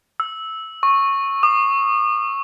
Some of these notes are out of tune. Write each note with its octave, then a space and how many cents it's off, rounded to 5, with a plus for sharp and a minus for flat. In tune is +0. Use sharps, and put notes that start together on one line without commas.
E6 -10
C#6 -10
D#6 -45